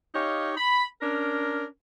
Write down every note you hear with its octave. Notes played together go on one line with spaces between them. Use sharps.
D#4 G4 C#5 D#5 F5
B5
C#4 D4 A#4